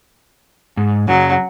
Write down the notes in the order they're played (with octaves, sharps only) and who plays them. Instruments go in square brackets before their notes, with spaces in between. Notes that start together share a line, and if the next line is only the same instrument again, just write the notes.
[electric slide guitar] G#2
[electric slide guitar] F#2 C#3 [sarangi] F#3